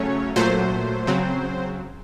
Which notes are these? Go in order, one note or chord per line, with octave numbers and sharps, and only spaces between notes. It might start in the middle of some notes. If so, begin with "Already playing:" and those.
Already playing: C#3 F#3 A3 C#4 C#5
A#2 F#3 A3 C5
C#3 F#3 C4